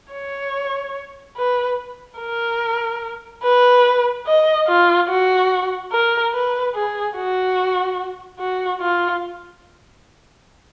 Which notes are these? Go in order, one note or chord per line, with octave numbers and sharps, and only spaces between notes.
C#5
B4
A#4
B4
D#5
F4
F#4
A#4
B4
G#4
F#4
F#4
F4